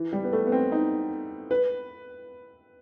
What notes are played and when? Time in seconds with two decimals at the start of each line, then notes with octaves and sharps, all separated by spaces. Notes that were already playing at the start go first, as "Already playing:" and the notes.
Already playing: E3
0.13 G3
0.24 B3
0.33 A3
0.47 B3
0.52 C4
0.72 D#4
1.51 B4